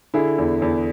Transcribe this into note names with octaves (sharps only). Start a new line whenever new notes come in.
D3 E4 G#4
E2
E2